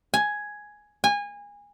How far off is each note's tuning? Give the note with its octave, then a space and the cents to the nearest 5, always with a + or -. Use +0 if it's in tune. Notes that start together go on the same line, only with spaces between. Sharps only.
G#5 +5
G#5 -25